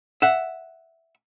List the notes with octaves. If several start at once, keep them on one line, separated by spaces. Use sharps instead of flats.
E5 F#5